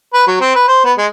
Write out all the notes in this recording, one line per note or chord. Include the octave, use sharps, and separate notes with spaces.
B4
F#3
C4
B4
C5
B3
G#3